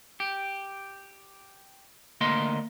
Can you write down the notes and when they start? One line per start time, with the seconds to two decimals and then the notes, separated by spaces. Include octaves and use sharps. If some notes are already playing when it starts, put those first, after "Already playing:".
0.20 G4
2.21 D2 A#3 D#5 C6